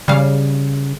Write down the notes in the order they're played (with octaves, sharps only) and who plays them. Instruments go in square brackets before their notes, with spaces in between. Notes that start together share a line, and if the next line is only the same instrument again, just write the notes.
[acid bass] C#3 [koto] G3 F5